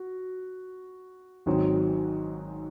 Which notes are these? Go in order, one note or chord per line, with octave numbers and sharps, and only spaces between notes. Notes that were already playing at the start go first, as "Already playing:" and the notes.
Already playing: F#4
G#1 G#2 D#3 F#3 C4